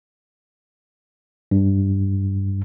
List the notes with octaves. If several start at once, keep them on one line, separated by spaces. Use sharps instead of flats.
G2